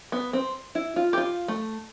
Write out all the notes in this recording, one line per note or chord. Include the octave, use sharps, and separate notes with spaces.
B3
C4
E4
F4
G4
F4
A3